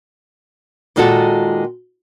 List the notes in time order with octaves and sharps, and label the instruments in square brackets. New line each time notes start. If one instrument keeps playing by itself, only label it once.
[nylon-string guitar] A#2 D#3 G#3 F4 F#4 A4